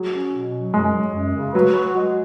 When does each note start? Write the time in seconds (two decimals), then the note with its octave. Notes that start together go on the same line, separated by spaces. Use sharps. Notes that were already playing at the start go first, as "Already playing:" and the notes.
Already playing: F#3 G#4
0.12 C#4
0.33 B2
0.52 F#3
0.73 F#2 G#3
0.93 F#3
1.14 F#2
1.35 C#3
1.54 F#3 B4
1.75 F#4
1.96 G#3